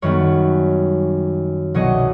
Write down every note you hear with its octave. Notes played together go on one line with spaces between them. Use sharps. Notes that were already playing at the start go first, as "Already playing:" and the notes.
F#2 D#3 G3 B3 B4 C#5
C2 B2 F#3 C#5 D#5